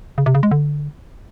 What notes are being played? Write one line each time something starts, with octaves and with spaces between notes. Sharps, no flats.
C#3
C3
C#3
G#3
D3